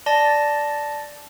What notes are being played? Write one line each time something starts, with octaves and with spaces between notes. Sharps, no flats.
D5 A5 A#6